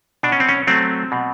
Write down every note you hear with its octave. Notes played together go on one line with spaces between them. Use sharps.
B2 D4
C#4
C4
C#4
F#3 A3 C4
B2